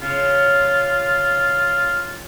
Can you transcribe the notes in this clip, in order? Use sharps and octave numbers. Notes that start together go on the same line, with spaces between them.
C#3 F4